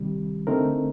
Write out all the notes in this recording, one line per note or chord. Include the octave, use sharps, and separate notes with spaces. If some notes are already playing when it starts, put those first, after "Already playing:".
Already playing: C3 D#3 G3
D3 A3 C4 D#4 A#4